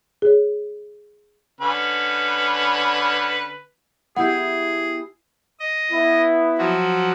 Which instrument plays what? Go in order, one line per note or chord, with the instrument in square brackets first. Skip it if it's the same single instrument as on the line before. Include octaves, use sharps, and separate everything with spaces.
[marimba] G#4 C#5
[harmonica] D3 C#4 B4
[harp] B3 E4 G4 [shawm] G#4 [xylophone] F#5
[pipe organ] D#5
[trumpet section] B3 E4
[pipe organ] F3 F#3 F#4